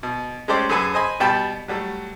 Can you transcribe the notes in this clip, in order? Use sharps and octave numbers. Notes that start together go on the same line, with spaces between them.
B2
G#3 A3 C#4 G4 C5 D5
F#2 G#4 A4 B4 G#5
C5 D#5 G#5 B5
B2 G3 G5 A5 B5
F#3 G3 A3